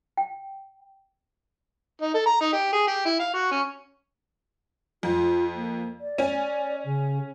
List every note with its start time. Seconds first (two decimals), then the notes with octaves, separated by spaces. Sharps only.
0.17 G5
2.01 D#4
2.14 A4
2.26 A#5
2.41 D#4
2.53 G4
2.73 G#4
2.88 G4
3.06 E4
3.20 F5
3.34 F#4
3.52 C#4
5.03 F2 F4
5.54 A#3
6.00 D5
6.18 C#4 G#5
6.84 C#3